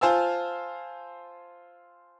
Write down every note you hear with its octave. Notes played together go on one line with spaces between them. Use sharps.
F4 C5 F5 G#5 A5 E6